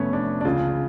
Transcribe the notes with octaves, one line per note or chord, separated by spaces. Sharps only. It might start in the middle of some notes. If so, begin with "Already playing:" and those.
Already playing: F1 F2 A3 B3 C#4
D4
D4
C#2 C#3 F4